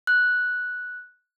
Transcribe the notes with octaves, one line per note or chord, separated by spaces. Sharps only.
F#6